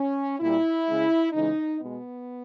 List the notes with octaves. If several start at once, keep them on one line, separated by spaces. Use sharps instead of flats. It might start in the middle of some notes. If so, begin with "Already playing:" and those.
Already playing: C#4
A#2 G3 E4
C#3 G#3
C#3 E3 G#3 D#4
B2 G#3 B3